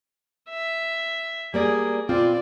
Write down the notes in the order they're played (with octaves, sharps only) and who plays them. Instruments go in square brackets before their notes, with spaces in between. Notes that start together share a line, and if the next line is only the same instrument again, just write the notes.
[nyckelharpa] E5
[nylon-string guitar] G3 A#3 D5 [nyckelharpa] G#4
[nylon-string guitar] B2 C4 F4 [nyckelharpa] D5